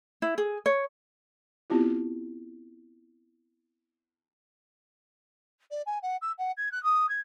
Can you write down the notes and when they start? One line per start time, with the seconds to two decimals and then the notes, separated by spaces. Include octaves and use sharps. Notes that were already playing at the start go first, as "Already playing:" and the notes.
0.22 E4
0.38 G#4
0.66 C#5
1.70 B3 C4 E4 F4 G4
5.71 D5
5.86 G#5
6.03 F#5
6.22 E6
6.39 F#5
6.57 G#6
6.72 F#6
6.84 D#6
7.09 G#6